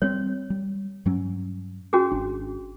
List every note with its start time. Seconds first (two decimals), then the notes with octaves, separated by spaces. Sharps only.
0.02 G3 C4 C#5
0.50 G3
1.06 G2 F#3 C#4
1.93 C#4 F#4 G#4
2.12 G#1 D4